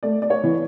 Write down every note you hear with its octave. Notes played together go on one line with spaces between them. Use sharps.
A3 D5
D5
C#5
E3